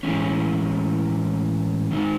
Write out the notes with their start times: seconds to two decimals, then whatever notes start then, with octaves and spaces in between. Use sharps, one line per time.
0.03 A2 E3 G#3 C#4
1.91 D#3 G#3 D#4